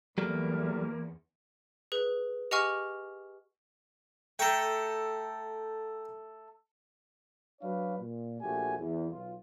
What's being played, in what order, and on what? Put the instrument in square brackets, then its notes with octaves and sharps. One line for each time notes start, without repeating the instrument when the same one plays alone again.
[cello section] E2 [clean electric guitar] F#3 G3 A3 [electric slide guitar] A#3
[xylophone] G#4 B4
G4 D#5 F#5 G#5 C#6 F6
[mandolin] A3 A4 [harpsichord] G5 A#5
[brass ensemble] F#3 D4 B4 C#5 F5
A#2
A#1 A3 F#4 G4 G#5
E2
B1 F4